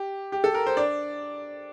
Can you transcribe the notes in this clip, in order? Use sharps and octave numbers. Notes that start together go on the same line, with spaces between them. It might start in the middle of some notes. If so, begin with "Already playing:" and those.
Already playing: G4
G4
A4
A#4
C5
D4 D5